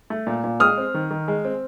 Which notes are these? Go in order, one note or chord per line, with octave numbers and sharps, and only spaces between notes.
A3
A#2
A#2
G#3 D#6 F6
C4
D#3
D#3
G#3
C4